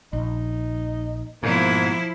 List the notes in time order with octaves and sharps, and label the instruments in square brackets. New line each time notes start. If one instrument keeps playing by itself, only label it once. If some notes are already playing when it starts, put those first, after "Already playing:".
[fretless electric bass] A#1 [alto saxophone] D#4
[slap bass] G#2 [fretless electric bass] B2 [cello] F3 E4 [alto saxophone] A#3